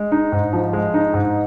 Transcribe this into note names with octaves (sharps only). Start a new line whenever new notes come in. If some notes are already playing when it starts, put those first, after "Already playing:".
Already playing: G#3
D#4
G#2
F3
G#3
D#4
G#2